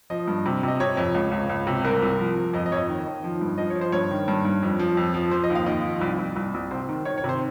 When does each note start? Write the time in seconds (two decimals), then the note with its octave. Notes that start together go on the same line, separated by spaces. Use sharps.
0.10 F3 D#5
0.27 G2
0.45 C3
0.63 C3 D#5
0.80 C3 C#5
0.97 F2
1.15 C#2
1.31 C#2
1.49 C#2
1.67 C3
1.84 C2 A#4
2.02 C2
2.19 F3
2.37 F3
2.53 F2 D#5
2.66 D#5
2.71 F2 C#5
2.77 D#5
2.88 D#3
3.06 D#3
3.24 F3
3.41 G2
3.58 F3 D#5
3.70 C#5
3.75 F3
3.81 C5
3.92 G2 C#5
4.11 D#3
4.28 G2
4.45 G2
4.62 F2
4.79 F3
4.97 F2
5.14 F3
5.31 F3 C5
5.44 D#5
5.50 D#2
5.55 F5
5.66 D#2 D#5
5.85 F3
6.01 C2
6.19 C2
6.36 C2
6.54 C2
6.71 C3 C5
6.89 D#3
7.05 D#3 C#5
7.18 C#5
7.24 C3
7.29 C5